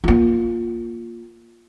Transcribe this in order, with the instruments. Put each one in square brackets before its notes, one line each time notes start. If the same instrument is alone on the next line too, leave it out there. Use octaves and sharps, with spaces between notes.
[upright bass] A#3 F4